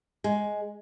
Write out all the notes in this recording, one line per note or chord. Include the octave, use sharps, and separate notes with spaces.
G#3